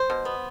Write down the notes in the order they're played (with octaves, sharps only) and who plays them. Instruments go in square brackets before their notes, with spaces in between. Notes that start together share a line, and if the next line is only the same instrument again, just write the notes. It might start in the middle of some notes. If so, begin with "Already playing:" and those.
Already playing: [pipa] C5
B2
B3